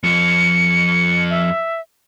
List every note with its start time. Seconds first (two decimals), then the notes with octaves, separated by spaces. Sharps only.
0.03 F2 F3 C#7
1.30 E5